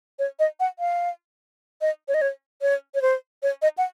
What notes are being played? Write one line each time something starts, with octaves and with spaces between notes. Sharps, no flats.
C#5
D#5
F#5
F5
D#5
C#5
D#5
C#5
C#5
C#5
C5
C#5
D#5
F#5